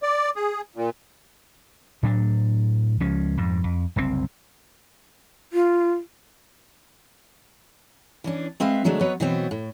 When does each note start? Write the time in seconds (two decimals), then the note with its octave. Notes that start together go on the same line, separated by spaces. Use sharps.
0.03 D5
0.36 G#4
0.76 A#2
2.03 A2 F#3 D4
3.00 C#2 F3 G#3 C#4
3.37 F2 G#2
3.64 F2
3.96 F#1 C2 B2 C4
5.53 F4
8.24 E3 C#4 D4
8.60 G#3 C4 B4 E5 F5
8.84 D3 F#3 G#3 A3 D4
9.01 F#3 B3 B4 C#5 D#5
9.20 B2 E3 F#3 B3 C4
9.51 A2